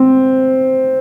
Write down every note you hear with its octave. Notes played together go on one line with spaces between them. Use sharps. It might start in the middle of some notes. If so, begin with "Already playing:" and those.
Already playing: C4